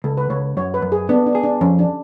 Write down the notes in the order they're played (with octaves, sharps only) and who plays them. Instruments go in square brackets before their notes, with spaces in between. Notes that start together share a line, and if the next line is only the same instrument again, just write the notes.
[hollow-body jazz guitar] C#2 [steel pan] A4
[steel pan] B4
[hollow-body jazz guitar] C#2 [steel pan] C#5
[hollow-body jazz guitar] F#2 [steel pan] C#5
[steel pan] B4
[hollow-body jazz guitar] F#2
[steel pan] G#4
[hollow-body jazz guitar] B3 [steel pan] D4
[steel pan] D4
[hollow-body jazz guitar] G#4
[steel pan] D4
[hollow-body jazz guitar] F2 [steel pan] C#4
[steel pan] D4